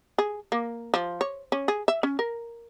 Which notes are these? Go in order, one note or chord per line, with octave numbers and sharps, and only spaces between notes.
G#4
A#3
F3
C#5
C#4
G#4
E5
C#4
A#4